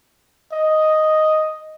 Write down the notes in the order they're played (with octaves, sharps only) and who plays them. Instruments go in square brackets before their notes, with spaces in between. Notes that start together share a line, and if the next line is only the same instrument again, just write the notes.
[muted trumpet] D#5